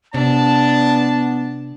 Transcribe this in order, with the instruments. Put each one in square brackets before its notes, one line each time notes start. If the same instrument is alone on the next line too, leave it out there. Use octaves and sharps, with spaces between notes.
[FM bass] C3 [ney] B3 [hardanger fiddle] D4 [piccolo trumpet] A5